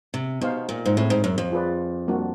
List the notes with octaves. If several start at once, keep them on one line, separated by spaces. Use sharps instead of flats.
C3
B2 B3 D#4 G4 C5 F5
A#2
G#2
A2 C4 E4 G#4 C#5 E5
G#2
F#2
F2
F4 G#4 B4 D5
G3 A#3 D4 F#4